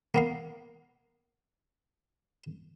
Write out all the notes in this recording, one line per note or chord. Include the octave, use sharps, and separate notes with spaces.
A#3 B3 F5